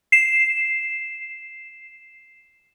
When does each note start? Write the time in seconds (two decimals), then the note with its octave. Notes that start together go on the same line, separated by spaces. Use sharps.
0.12 C7 E7